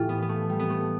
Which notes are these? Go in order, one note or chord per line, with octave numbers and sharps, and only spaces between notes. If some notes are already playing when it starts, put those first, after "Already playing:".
Already playing: A2 E3 F4 G4
B3
B3
A3
G3
B3
A3